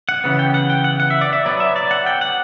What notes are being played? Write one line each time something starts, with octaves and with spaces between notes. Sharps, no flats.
F#5
C#3 E3 B3
G5
F#5
G5
F#5
F#5
E5
D5
E5
F#3 B3 D5
E5
D5
F#5
G5
F#5